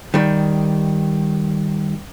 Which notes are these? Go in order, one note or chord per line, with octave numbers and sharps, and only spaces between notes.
D#3 G3